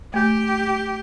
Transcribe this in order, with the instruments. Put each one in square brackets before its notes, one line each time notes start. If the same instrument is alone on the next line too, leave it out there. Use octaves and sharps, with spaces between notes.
[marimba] A3 G6 [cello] G4